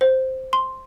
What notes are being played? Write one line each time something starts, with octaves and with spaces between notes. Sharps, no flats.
C5
C6